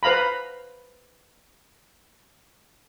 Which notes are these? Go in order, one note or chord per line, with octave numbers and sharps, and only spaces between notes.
B4 C5 F5 A#5 B5